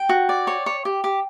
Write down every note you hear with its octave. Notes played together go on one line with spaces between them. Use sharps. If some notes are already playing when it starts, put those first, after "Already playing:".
Already playing: G5
F#4
D5
C#5
C#5
G4
G4